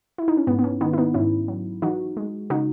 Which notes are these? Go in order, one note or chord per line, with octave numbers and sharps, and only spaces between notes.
E4
D#4
C#4
G#2 B3
B3
C#4
D#3 B3 D#4
E4
B3 D#4
G#2 C#4 E4
F#3
E3 D#4 F#4
G#3
C#3 D#4 F#4